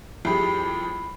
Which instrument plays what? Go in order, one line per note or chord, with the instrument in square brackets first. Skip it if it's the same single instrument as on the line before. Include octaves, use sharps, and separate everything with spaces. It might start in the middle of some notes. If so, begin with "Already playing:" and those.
[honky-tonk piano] F2 G4 G#4 [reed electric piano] G3 E4 [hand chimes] B5 C7